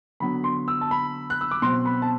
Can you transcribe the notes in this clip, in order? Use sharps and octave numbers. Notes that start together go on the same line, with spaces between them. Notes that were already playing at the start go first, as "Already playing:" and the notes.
D3 F#3 B3 B5
C6
E6
A5
B5
F#6
E6
D6
B2 F#3 C4 C6
B5
A5